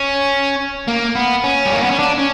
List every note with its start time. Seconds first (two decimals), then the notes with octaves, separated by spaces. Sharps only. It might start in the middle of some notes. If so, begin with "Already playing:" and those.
Already playing: C#4
0.88 A#3
1.15 B3
1.44 C#4
1.66 G3
1.73 A#3
1.82 B3
1.91 C#4
1.99 D4
2.18 C#4